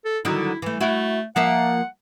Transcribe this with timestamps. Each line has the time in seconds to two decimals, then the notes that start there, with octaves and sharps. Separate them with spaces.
0.05 A4
0.25 D3 D#3 F#3 E4
0.62 E3 A3
0.81 A3 E4 F#4
1.36 F3 A#3 E5 F#5